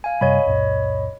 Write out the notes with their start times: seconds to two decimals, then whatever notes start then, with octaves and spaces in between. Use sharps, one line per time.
0.04 F5 G#5
0.21 F#2 C3 G3 C#5 D#5 B5
0.46 C#2 F#2 A#2